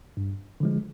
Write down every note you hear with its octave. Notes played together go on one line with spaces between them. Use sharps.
G2
D3 F3 G#3